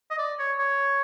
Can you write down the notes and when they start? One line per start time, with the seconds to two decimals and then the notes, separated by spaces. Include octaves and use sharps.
0.11 D#5
0.18 D5
0.39 C#5
0.58 C#5